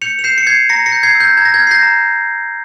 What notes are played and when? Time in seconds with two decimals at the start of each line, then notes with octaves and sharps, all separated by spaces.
0.02 G6 C#7 F7
0.19 F7
0.24 G6 C7 E7
0.38 C#7
0.47 G6 G#6 C7
0.69 A#5 A#6 C#7
0.86 A#6 C#7
0.92 G6
1.03 G#6 C7
1.15 E6
1.20 G6
1.37 A#5 G#6
1.45 A#6
1.54 G#6
1.60 F6
1.67 C7
1.71 G6 A#6
1.83 A#5